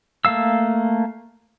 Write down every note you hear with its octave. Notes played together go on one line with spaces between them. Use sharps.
A3 A#3 F5 E6